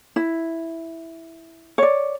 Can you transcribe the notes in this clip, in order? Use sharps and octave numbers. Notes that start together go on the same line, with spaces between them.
E4
C#5 D5